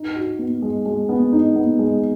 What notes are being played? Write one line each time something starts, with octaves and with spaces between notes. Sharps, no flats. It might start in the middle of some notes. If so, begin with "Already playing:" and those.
Already playing: D#4
F#4
B3
G#3
G#3
B3
D#4
B3
G#3